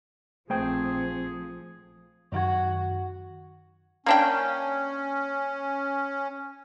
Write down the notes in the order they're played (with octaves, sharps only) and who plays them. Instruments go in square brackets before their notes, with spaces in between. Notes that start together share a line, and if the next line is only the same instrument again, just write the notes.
[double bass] A#1 C4 [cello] F3 [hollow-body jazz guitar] A3 C5 G5 [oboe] G#4
[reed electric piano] F#2 D#3 G#6 [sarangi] F#4
[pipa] A#3 D4 G5 [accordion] C#4